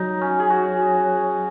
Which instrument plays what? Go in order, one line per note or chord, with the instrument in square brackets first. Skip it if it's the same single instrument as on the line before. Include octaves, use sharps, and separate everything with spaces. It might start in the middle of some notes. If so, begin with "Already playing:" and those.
Already playing: [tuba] F#3 [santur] D#4
[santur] C#4
G#4
F#4